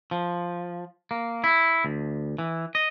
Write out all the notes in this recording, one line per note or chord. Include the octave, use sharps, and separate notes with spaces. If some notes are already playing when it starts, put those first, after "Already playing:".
F3
A#3
E4
D2
E3
D#5